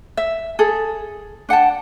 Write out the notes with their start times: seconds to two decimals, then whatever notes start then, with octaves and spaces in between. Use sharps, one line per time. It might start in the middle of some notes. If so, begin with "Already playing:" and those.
0.17 E5
0.59 G#4 A4
1.49 D4 F#5 G5 A5